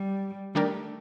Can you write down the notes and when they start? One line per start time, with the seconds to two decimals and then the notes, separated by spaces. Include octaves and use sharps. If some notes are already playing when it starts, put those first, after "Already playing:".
Already playing: G3
0.55 D#3 G3 A3 D4 G4 A#4